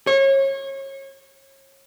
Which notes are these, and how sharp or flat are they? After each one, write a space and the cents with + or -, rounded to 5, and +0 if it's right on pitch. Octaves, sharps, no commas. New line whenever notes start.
C#5 -30